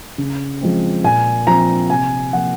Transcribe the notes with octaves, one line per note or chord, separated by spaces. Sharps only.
C#3
F3 G#3 C4
A#2 G#5
F3 C4 A#5
C3 G#5
F3 A#3 F#5